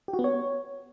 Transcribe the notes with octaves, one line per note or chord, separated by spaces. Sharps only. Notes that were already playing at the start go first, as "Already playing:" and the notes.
G4
F#4
B3
C#5